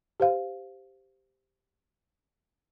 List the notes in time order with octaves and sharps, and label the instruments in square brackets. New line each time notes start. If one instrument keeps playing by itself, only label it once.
[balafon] G4 C5 F5